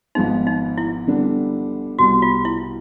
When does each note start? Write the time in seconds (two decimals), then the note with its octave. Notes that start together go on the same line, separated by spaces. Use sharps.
0.15 G#1 G#2 F3 G#3 B3 D#4
0.47 D#4
0.78 E4
1.07 D3 G3 B3 D4
1.99 C2 B2 G3 B3 F#4
2.22 F4
2.45 E4